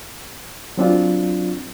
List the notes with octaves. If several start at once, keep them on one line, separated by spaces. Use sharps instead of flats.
F#3 C4 D4 F4